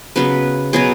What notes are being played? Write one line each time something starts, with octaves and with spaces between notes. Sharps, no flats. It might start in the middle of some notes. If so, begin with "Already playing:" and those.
C#3 F#3 B3 B4
B2 F#3 B3 G#4